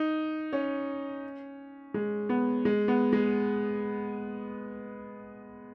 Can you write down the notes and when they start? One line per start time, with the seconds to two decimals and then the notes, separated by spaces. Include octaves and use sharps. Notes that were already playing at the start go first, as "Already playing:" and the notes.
Already playing: D#4
0.53 C#4
1.94 G#3
2.29 B3
2.65 G#3
2.88 B3
3.13 G#3